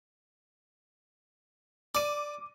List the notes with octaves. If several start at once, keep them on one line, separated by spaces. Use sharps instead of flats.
D5 D6 D#7